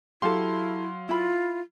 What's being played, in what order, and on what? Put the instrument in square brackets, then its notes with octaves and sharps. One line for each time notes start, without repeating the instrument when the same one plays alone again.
[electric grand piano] F#3 F5 C6 [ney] E4 [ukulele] G4 A4
[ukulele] E4 B5 [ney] F4